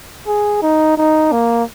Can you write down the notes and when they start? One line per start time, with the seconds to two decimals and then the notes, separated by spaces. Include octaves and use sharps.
0.27 G#4
0.62 D#4
0.97 D#4
1.32 A#3